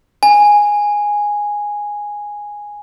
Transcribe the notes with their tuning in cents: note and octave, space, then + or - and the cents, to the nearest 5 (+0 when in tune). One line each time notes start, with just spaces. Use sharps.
G#5 -5